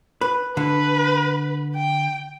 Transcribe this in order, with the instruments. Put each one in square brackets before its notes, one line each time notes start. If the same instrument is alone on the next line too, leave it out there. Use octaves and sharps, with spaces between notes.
[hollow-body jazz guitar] B4
[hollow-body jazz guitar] D3 [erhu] B4
[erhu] G5